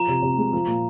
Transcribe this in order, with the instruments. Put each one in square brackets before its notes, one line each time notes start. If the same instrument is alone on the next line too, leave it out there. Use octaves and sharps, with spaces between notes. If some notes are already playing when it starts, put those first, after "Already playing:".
Already playing: [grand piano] F3 [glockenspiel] A#5
[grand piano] C3
C3
G#3
F3
A#2